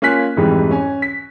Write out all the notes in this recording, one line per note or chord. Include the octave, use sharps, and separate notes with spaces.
A#3 C#4 F4 G#5 F#6 B6
F2 G#2 E3 G3
C#4 G#5
B6